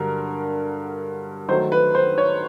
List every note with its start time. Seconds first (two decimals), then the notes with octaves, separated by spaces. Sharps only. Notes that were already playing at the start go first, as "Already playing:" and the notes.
Already playing: G2 D3 F#3 A#4
1.48 D#3 F#3 A3 C5
1.72 B4
1.95 C5
2.18 C#5